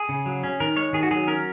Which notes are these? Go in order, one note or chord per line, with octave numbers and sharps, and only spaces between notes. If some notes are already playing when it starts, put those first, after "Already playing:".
Already playing: G#4
C#3
F#3
C#4
D#3 A#4
G#3 C#5
D#3 G#4
F#4
F#3 G#4
C#4 A#4